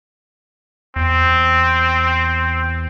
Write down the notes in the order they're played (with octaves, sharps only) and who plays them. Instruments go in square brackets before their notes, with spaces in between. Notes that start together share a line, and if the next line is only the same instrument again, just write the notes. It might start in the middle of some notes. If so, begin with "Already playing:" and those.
[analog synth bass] E2 [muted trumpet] C4